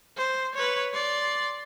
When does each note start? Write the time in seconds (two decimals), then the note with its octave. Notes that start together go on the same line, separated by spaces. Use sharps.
0.17 C5
0.54 B4 C#5
0.93 D5 C6